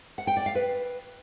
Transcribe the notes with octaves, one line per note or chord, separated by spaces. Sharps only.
F#5
G5
D5
F5
B4